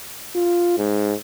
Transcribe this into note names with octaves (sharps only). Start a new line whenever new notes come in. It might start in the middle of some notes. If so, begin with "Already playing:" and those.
F4
G#2